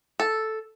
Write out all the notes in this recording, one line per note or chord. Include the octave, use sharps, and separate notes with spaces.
A4